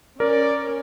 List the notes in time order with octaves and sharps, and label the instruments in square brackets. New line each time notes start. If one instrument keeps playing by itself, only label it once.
[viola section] C#4 [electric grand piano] A#4 [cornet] D5